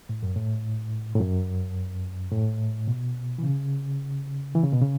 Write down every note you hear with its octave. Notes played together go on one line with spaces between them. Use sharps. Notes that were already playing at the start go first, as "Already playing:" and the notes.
A2
F#2
A2
A2
F#2
A2
B2
E3
C#3
E3
C#3
B2
C#3